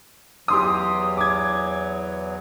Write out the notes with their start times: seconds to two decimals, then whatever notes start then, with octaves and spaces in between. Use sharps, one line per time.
0.48 E2 E3 F#3 G4 C6 D#6
1.17 D6 G#6